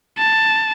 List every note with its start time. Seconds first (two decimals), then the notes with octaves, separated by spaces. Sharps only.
0.18 A5